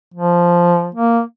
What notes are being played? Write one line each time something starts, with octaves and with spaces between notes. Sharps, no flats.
F3
A#3